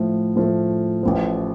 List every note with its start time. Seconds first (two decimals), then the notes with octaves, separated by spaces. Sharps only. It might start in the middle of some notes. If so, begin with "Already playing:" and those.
Already playing: A2 F3 A3
0.36 A2 F3 A3
1.03 A1 A2 F3